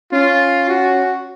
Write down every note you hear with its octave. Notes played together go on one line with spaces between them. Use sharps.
C#4 F4
F#4